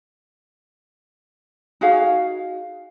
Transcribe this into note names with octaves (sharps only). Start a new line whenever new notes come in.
D#4 F#4 G#4 F5